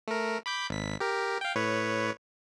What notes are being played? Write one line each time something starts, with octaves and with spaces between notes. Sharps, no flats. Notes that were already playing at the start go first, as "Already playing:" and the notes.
A3 A#4
B5 D6 G6
G#1 B6
G4 A#4
F5 G5
A2 B4 C#5